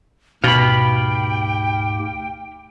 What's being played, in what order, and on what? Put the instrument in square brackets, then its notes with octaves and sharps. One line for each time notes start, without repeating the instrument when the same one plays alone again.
[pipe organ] D2 G#2 G4 [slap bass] B2 [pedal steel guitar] F5 B5 [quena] G5